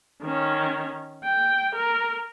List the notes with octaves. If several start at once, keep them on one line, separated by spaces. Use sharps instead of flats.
D#3 C#4
G5
A#4